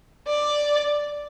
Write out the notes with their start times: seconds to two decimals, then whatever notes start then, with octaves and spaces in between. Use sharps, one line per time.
0.27 D5